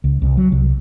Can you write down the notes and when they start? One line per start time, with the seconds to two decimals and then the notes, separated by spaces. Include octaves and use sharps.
0.04 C#2
0.22 C2
0.37 F#3
0.52 C2